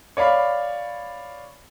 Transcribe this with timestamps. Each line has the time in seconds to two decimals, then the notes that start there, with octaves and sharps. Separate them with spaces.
0.17 C#5 D5 F5 B5